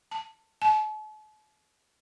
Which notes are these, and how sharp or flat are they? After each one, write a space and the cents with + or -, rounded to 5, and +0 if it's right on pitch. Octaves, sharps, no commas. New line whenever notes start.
A5 +20
A5 -45